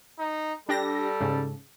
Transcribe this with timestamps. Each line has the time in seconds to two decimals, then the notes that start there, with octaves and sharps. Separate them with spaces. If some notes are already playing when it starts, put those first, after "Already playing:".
0.19 D#4
0.69 G3 D4 G4 A4 A#6
1.20 G#2 C#3